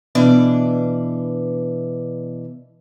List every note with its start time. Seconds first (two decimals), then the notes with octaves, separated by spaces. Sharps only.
0.15 B2 E3 D4 D5